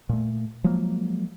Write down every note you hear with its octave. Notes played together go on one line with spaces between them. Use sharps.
A#2 A3
F3 F#3 G#3 A#3